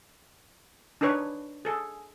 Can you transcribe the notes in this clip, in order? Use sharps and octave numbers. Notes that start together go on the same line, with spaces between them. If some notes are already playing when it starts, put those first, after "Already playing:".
D4 D#4 A#4 B4 C#5
G#4 A4